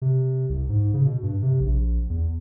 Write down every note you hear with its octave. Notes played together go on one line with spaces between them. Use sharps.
C3
C2
G#2
C#3
B2
G2
C3
A#1
E2